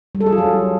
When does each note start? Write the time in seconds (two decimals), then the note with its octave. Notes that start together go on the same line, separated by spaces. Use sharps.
0.15 G3
0.21 A4
0.26 G#4
0.32 F4
0.38 F#3